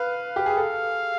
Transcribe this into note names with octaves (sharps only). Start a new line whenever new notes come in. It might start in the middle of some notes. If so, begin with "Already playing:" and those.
Already playing: B4 F5
G4
G#4
A4 F5